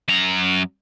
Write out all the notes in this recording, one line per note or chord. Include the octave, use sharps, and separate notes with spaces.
F#2 A#5